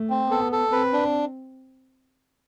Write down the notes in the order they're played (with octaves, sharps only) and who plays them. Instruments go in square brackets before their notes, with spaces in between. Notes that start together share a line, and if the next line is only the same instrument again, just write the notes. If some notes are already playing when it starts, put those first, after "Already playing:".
Already playing: [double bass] A3
[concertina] C4
[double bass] B3 [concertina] A4
[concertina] A4
[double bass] C4 [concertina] B4
[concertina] D4